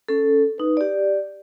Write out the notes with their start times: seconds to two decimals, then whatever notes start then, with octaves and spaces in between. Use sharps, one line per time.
0.08 C#4 A4
0.58 D#4 B4
0.77 G4 D5